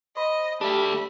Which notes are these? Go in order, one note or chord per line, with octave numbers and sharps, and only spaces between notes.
C5 D#5 B5
A3 D4 G4 B5